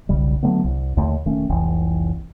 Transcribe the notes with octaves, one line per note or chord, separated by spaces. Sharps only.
E1 B1 C#3 G3
D3 F#3 A3 B3
C2
D#2 D3 A3
E1 D#3 A3 C#4
F1 C2 E3